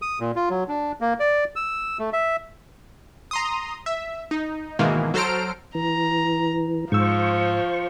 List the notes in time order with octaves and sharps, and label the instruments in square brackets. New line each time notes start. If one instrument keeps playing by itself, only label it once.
[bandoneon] D#6
A#2
F4
F#3
D4
A#3
D5
E6
A3
E5
[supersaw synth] A#5 C6 D#6
E5
D#4
G#2 B2 D#3 E3 G#3 A#3
F#3 A4 C5 A#5 F6 D7
[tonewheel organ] E3 [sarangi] A#5
[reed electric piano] G#2 E6 [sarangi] F3 [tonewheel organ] C5 C#6